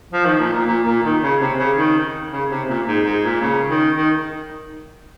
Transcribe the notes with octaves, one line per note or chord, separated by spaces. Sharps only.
F3
D#3
A#2
A#2
A#2
A#2
D#3
C#3
C3
C#3
D#3
C#3
C3
A#2
G#2
G#2
A#2
C#3
D#3
D#3